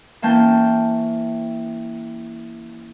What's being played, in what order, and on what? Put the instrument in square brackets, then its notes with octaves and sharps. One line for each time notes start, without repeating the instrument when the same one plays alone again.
[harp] E3 A#3 C#4 G5 A5 G6